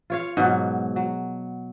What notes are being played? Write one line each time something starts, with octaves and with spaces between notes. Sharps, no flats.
F4 C#5 F5
G#2 B2 F#3
F#3